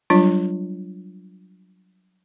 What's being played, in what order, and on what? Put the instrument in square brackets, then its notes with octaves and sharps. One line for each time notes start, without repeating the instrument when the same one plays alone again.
[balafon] F#3 G3 D4 F4